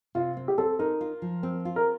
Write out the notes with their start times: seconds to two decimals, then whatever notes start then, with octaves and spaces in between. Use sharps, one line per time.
0.15 C3 F4
0.37 C4
0.48 G4
0.58 C4 A4
0.79 D#4 A#4
1.01 F4
1.22 F3
1.43 C4
1.65 F4
1.76 A#4